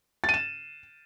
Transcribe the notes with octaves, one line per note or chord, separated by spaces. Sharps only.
A6
D#7
E7